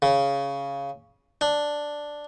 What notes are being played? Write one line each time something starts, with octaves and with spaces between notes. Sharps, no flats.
C#3
D4